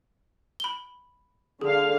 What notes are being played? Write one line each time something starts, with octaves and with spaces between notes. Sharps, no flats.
B5 G7
D3 G#4 F5